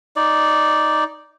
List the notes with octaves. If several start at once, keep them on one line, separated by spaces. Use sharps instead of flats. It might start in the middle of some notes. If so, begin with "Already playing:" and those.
D#4 D5